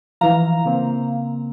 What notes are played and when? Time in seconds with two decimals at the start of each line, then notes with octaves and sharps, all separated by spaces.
0.21 E3 F3 F5 A#5
0.65 C#3 A#3 C4